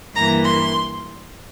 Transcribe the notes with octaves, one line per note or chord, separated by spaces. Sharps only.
G2 E3 A#3 A#5
C6